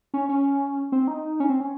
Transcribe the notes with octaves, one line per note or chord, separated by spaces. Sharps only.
C#4
C#4
C4
D#4
C#4
C4
C#4